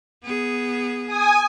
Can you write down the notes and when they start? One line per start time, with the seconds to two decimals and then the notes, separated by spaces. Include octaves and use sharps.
0.23 B3 G#4
1.06 G#5 D#6